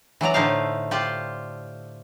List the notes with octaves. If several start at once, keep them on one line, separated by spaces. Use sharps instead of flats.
E3 F#3 D5 A#5
A2 D3 A3 D#4 C5 F5
F4 G4 C5 D5